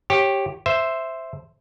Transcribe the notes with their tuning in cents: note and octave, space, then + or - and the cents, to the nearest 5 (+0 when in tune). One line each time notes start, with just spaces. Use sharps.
G4 +0 C#5 -20
C5 +0 E5 +0